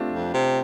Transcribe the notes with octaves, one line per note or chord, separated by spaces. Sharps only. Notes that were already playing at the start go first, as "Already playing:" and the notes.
Already playing: A3 C4 D4 F4
F2
C3